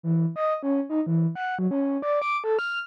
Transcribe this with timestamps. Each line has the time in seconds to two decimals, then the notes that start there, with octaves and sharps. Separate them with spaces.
0.03 E3
0.36 D#5
0.63 C#4
0.89 D#4
1.07 E3
1.35 F#5
1.59 F#3
1.71 C#4
2.02 D5
2.22 D6
2.44 A4
2.59 F6